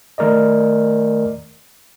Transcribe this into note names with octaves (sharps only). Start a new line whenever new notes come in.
D#3 A3 A#4 D5 D#5